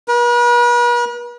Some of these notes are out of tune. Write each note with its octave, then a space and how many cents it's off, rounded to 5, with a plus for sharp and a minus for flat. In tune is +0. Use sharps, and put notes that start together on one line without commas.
B4 -45